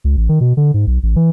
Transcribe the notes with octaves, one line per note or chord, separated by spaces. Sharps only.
C#2
A1
D#3
B2
D3
G#2
B1
A1
E3